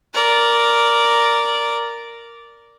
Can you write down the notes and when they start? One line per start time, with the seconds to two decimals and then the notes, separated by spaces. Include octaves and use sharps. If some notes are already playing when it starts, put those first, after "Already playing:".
0.14 A#4 D5